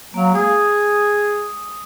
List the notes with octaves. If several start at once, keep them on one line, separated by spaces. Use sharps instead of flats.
F#3 A#3 F5
G#3 G#4 D#6